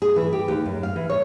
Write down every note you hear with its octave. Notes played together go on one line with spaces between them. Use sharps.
G#4
E3
G4
D#2
F#2
F5
E3
C#5